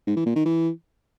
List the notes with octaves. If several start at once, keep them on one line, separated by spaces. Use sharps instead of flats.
G#2
E3
A#2
D#3
E3